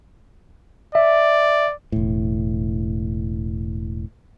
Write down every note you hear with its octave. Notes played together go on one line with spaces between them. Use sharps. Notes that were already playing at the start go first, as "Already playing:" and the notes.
D5 E5
E1 A2